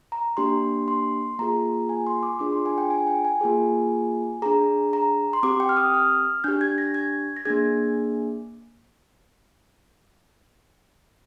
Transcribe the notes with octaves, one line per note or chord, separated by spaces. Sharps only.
A#5
A#3 D4 G4 C6
C6
A#3 F4 G#4 A#5
G#5
C6
D6
D4 F4 G#4 D6
C6
G#5
G5
G#5
G5
G#5
A#3 F4 G#4
D4 G#4 A#5
A#5
C6
C4 G4 D6
G5
F6
D#6
F6
D4 G4 G6
G#6
A#6
G#6
A#6
A#3 D4 G#4 G#6